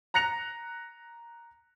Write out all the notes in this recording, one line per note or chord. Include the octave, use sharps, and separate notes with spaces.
A#5 F#6 A#6 C#7 F7